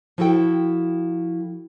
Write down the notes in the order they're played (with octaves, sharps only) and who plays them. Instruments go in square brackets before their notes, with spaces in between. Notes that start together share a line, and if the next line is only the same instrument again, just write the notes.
[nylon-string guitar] F3 E4 F#4 A4 G5